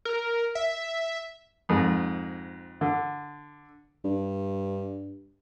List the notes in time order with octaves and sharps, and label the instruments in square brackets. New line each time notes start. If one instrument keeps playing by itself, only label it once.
[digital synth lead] A#4
E5
[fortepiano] F2 G#2
D3
[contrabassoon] G2